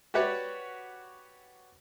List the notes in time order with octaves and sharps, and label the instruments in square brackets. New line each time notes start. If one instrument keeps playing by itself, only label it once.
[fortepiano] F#4 G4 B4 C#5 D5